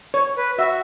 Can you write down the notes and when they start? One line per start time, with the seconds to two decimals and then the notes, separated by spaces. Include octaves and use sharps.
0.14 C#5
0.37 B4
0.59 F#4 E5